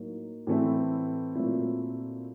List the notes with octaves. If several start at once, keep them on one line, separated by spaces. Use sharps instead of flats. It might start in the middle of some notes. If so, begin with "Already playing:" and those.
Already playing: A2 F#3 A#3 D#4
A2 E3 A3 C4 E4
A#2 F#3 A3 C4 E4